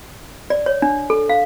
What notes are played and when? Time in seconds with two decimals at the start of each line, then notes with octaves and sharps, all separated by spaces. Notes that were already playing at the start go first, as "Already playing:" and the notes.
0.50 D5
0.66 C#5
0.82 D4
1.10 A4
1.29 F5